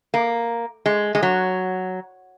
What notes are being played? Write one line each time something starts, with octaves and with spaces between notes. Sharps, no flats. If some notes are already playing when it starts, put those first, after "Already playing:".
A#3
G#3
G#3
F#3